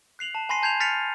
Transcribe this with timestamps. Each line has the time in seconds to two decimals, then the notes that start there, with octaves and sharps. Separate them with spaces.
0.19 F#6 C7 F7 F#7
0.35 A5
0.49 G#5 B5 C6 A#6 C7 D#7
0.63 A5 G6 G#6 C7 D#7 F7
0.80 F6 A6 B6 C#7 D#7 F7